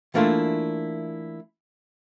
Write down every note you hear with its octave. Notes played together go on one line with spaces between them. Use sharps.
E3 A3 A#3 D4 E4 F4